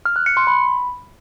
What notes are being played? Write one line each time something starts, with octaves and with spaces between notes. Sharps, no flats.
F6
F#6
C#7
C6
B5